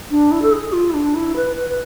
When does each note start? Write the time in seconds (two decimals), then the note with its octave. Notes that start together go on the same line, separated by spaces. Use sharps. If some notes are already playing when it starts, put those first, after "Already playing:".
0.11 D4
0.32 E4
0.42 A4
0.52 G#4
0.73 F4
0.90 E4
0.94 D4
1.15 E4
1.36 B4
1.56 B4
1.70 B4